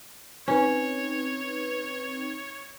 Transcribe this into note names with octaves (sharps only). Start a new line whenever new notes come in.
C4 C#4 D#4 B4 C#5